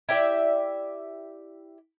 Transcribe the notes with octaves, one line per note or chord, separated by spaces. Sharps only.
E4 G4 D5 E5